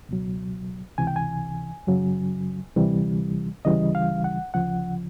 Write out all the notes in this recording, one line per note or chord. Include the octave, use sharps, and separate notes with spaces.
C#2 B2 F#3
C#2 C3 E3 G#5
G5
G#5
F#2 C#3 F#3
D2 C3 E3 G3
D2 C#3 E3 G3 D#5
F5
F#5
D2 C#3 F3 F#5